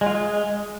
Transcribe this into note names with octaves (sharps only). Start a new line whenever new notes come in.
G#3
F4
G#3